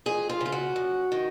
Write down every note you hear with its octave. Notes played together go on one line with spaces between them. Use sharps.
F2 G#4
F4
C#3
F4
F#4
F#2
D#3